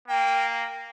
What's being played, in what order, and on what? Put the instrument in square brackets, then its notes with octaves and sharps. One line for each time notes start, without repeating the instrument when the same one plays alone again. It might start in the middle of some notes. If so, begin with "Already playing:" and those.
[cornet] A#3 [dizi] G5